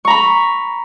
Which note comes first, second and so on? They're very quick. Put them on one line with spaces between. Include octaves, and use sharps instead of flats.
C#6 A#5 B5